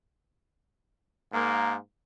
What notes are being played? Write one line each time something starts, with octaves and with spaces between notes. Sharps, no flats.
G#2 A#3